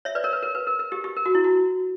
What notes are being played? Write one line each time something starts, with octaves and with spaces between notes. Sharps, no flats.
C#5 E5
B4 D5
A#4 C#5
B4
A#4
B4
A#4
A#4
G4
G4
A#4
F#4
E4
F#4